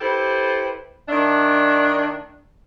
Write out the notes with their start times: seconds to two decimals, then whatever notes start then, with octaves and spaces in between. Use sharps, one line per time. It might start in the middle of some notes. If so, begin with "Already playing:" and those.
0.01 E4 G4 A4 B4 C5
1.09 D#3 A3 D4